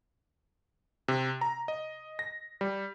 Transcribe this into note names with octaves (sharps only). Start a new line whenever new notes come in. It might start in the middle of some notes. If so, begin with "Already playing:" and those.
C3
A#5
D#5
A#6
G3